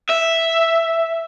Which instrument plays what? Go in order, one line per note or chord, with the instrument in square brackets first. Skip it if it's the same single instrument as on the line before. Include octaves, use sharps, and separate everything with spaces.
[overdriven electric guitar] E5